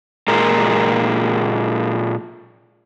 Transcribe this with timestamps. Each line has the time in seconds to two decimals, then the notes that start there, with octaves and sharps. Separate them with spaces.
0.28 A#2 G#3 A#4